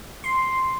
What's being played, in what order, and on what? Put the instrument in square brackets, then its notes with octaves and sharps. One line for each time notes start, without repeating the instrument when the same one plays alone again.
[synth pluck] C6